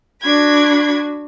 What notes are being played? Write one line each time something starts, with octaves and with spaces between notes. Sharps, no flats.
D4 F#4 B5 G#6